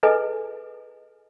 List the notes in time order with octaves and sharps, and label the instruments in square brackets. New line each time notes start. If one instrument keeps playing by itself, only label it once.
[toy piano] E4 G#4 A4 B4 D#5 G#5